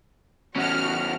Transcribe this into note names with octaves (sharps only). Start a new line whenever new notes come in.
E2 C#4 F#4 F6